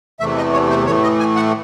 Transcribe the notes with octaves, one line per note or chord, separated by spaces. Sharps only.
E2 C3 E3 A3 E5
D#5
C#5
C5
A2 E3 A3 C#5
D#5
G#5
F#5